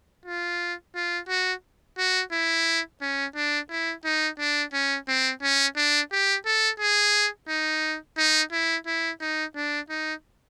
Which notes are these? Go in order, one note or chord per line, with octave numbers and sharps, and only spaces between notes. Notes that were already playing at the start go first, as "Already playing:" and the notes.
F4
F4
F#4
F#4
E4
C#4
D4
E4
D#4
D4
C#4
C4
C#4
D4
G4
A4
G#4
D#4
D#4
E4
E4
D#4
D4
D#4